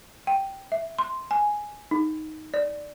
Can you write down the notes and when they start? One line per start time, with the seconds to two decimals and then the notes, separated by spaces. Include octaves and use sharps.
0.27 G5
0.72 E5
0.99 C6
1.31 G#5
1.91 D#4
2.54 D5